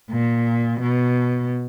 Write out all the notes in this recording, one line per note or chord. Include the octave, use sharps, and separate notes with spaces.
A#2
B2